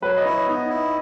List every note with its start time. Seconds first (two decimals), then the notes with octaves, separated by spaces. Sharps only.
0.02 F#3 B4
0.17 D#5
0.25 E4 C#5
0.47 B3 D#4
0.69 E4